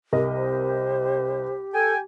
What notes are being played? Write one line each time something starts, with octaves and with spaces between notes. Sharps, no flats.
C2 G4 A#4 D#5
C5
A4 G5 G#5